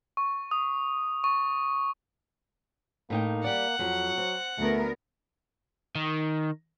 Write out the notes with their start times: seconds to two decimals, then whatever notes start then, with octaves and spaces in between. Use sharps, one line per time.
0.17 C#6
0.51 D#6
1.24 C#6
3.10 A2 A#3 D#4 G5
3.44 G3 D5 F#5
3.79 F2 F#3
4.18 C4
4.59 D2 A3 B3 A#4
5.95 D#3